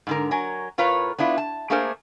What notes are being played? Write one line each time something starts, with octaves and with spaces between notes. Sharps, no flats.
G#2 D3 A#4
F#3 A#4 G#5
A2 F4 A#4 B4 C#5
B3 D4 E4 F4
A5
A3 A#3 D4 G#4 A#4 C5